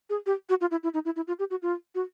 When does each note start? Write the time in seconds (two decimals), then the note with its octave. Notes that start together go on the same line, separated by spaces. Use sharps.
0.10 G#4
0.26 G4
0.49 F#4
0.61 F4
0.71 E4
0.83 E4
0.94 D#4
1.05 E4
1.16 E4
1.28 F4
1.39 G4
1.50 F#4
1.62 F4
1.95 F#4